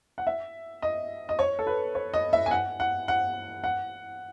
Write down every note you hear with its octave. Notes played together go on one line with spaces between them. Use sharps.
F#5
E5
D#5
D#5
C#5
A4
B4
C#5
D#5
E5
G#5
F#5
F#5
F#5
F#5